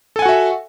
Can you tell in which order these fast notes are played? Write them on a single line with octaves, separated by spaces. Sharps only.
A4 G#5 F#5 F#4 E5